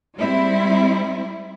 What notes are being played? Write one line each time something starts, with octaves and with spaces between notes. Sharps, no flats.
G3 G#3 C4 E4